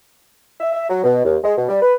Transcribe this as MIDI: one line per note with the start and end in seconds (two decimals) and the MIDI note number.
0.60 0.69 76
0.72 0.86 76
0.89 1.01 54
1.03 1.20 47
1.24 1.37 39
1.44 1.54 56
1.57 1.68 47
1.69 1.81 55
1.82 1.94 71